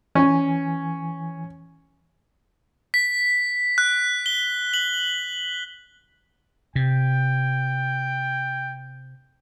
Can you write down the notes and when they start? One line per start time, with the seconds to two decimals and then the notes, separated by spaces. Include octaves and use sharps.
0.15 E3 C#4 G#5
2.94 B6
3.78 F#6
4.26 G7
4.74 F#7
6.76 C3 G5